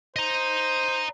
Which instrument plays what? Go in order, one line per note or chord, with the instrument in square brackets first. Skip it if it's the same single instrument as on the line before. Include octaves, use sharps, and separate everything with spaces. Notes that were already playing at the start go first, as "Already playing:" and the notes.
[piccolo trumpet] C5 [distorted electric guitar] D#5 A#5